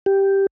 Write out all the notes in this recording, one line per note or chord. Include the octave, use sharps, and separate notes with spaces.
G4